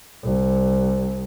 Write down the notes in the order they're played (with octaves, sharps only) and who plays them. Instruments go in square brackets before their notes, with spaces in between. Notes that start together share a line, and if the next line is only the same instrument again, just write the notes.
[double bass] C2